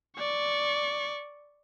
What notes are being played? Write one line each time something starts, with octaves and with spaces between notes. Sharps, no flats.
D5 C#6